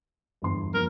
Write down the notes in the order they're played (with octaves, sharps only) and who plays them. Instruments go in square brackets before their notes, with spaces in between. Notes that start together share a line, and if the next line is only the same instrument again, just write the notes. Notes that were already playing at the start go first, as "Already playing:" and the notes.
[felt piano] G1 E2 C6
[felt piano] F2 A#3 [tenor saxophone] A#4